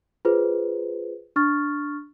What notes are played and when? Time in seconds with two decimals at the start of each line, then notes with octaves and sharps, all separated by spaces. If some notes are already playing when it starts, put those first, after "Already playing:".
0.25 F4 G#4 B4 C5
1.36 D4 C#6 F6 A6